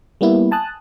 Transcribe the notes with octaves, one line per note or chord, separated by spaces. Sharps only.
G3 A#3 B3 E4
G#5 A5 D#6 F#6